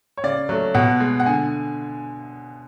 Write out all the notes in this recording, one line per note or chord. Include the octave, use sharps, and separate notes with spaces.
C#5
C#3 D5
F#3 A3
B2 F#5
G#3
F#5
D3 G#5